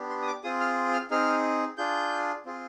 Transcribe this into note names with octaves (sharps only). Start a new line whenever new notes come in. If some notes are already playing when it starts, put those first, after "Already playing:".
Already playing: B3 D4 G4
C6
D#6
D6
C4 F4 G#4 D#6
F6
F6
C4 D#4 G#4 F6
D4 F4 G#4 G6
C4 F4 G#4